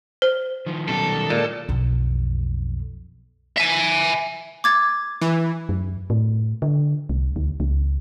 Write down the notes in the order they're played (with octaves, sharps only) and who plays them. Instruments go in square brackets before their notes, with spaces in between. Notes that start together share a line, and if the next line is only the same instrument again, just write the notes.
[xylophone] C5
[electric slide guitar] D#3 F3
[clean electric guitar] F#2 B2 [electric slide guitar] D#3 G3 G4 [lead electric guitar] A4
[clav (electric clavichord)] A#2 [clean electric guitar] G#3
[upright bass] B1 F2
[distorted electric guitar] E5 G#5
[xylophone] D6 G#6 A6
[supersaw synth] E3
[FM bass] F#2
A2
D3
C2
D2
C#2